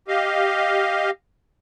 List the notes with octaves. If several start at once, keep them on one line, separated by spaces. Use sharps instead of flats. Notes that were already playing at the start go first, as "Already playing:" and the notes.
G4 D#5 F5